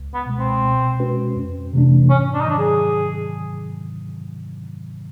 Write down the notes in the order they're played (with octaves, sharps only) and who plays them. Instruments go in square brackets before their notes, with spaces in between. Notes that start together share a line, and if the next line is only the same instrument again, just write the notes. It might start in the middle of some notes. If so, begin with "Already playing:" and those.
Already playing: [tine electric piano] C#2
[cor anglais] B3
[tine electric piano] B2 G#3
[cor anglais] C4
[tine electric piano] B2
G#3 C#4 F#4 B4
F2
C3 E3 A3 D4
[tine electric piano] G#2 [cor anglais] C#4
[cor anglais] D4
D#4
[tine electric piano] D#3 F#3 [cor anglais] D4
[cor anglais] G#4